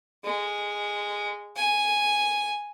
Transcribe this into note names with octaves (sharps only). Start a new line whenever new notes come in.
G#3
G#5